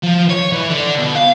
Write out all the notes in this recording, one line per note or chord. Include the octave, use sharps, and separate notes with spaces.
F3
C#5
E3
D3
B2
F5